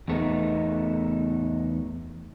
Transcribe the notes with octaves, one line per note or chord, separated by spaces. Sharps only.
E2 A3 B3 D#4